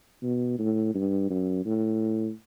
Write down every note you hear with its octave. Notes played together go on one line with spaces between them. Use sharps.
B2
A2
G2
F#2
A2